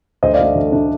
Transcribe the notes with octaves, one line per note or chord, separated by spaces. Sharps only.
D2 C5 D#5
D5 F5
D3 A3 D4
D2
D3 A3 D4